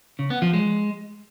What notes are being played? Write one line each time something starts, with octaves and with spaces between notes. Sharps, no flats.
C#3
B3
F3
G#3